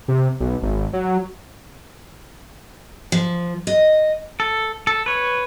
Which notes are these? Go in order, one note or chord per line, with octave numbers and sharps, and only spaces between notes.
C3
B1
G#1
F#3
F3
D#5
A4
A4
B4 C#5